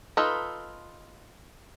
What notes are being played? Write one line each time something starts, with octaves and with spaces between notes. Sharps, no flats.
D#4 F4 A4 B4